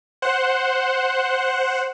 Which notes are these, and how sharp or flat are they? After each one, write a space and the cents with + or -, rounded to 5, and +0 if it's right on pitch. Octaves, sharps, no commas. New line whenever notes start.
C5 +0 F#5 +0